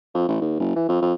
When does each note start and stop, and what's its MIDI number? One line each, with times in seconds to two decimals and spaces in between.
0.14 0.26 41
0.28 0.37 33
0.41 0.59 39
0.60 0.75 30
0.76 0.86 52
0.89 0.99 41
1.02 1.13 41